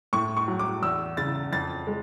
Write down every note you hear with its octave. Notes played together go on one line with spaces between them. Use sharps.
A2 C#6
C#6
F#3
D6
E2 E6
C#3 A6
F2 A6
G#3